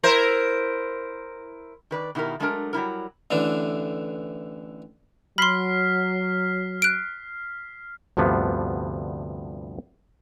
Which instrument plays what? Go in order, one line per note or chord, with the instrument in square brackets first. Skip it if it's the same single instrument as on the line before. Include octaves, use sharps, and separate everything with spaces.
[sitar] E4 A#4 C5
[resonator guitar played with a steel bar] D#3 B4 D5
B2 D#3 E4 G4 A#4
F#3 G#3 A3 D4 A4 A#4
F#3 G3 E4 A#4
[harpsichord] A1 D3 E3 D4
[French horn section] F#3 [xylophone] B5 C6 [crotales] F6 B6 C7
[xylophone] F#6 D7
[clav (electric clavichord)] D2 G2 C3 F3 B3 D4